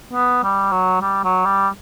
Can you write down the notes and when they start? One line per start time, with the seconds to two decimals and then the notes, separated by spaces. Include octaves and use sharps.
0.13 B3
0.43 G3
0.72 F#3
1.01 G3
1.24 F#3
1.45 G3